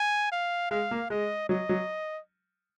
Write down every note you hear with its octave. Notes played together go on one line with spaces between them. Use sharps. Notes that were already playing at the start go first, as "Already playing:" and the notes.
Already playing: G#5
F5
G#3 F5
A#3
G#3 D#5
F#3 D#5
F#3